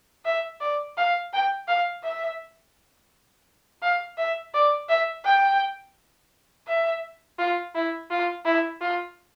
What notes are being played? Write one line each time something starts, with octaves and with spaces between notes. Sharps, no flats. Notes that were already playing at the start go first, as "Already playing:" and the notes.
E5
D5
F5
G5
F5
E5
F5
E5
D5
E5
G5
E5
F4
E4
F4
E4
F4